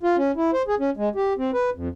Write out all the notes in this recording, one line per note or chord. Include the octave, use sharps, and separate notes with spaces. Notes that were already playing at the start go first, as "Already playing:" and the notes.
F4
C#4
E4
C5
G#4
C#4
G#3
G4
C4
B4
F2